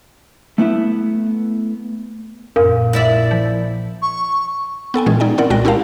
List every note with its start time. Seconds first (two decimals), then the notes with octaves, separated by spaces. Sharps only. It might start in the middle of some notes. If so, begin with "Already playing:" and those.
0.58 A3 B3 E4 E5
2.56 A#1 F#2 A#4 F5
2.93 E4 D5 E5
3.31 F3
4.02 C#6
4.94 B3 A4 G5 G#5
5.06 A#2 E3 G#3 C#4 G#4
5.20 D#4 D5 G5
5.38 C4 C#4 E4 A#4 D5 F#5
5.50 C2 A#2 G#3 F#4 G5 A#6
5.65 C#4 E4 G4 A#4 F5 A5